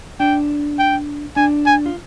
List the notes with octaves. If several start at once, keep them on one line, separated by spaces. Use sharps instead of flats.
D4 G5
G5
D4 G#5
G#5
F4